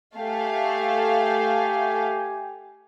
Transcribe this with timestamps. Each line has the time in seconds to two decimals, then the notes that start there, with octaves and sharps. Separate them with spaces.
0.17 A3 G4 F5 G5 G#5